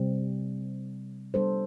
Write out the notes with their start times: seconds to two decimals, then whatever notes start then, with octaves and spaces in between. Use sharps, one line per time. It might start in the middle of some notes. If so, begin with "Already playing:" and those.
Already playing: C3 G3 C4
1.34 G3 B3 D4 A4 C5